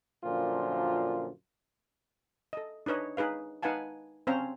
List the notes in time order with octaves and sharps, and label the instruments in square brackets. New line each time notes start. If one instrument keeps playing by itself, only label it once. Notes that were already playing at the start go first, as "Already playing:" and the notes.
[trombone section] F#2 A#2 D3 F3 F4
[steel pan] A4 D#5
D4 D#4 B4 C#5 D#5
D#4 G#4 B4 F5
D#4 B4 F5 F#5 G#5 A5
C4 C#4 C5 F5 A5 A#5